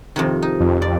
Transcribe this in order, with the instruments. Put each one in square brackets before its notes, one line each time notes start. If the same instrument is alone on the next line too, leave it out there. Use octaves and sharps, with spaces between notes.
[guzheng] F2 C3 D#3
D#4
[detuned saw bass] F2
[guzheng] D5